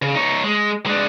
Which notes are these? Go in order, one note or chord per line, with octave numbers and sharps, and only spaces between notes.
C#3
D#4 C#5
G#3
G#3 D4